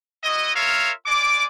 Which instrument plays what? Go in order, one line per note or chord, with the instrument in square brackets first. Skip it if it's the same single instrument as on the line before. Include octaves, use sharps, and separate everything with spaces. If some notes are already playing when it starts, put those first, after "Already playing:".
[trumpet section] E4 F#4 D#5
F4 A#4 C#5 E5 F5
G#3 D5 D6